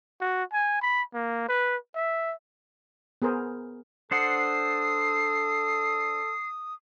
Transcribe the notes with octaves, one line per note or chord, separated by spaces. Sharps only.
F#4
G#5
B5
A#3
B4
E5
B3 G#4 A#4 C5
D4 A4 C5 F#5 D#6 C7